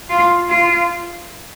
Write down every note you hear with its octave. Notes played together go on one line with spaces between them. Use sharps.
F4
F4